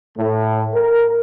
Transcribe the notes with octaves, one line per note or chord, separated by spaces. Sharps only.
A2
A#4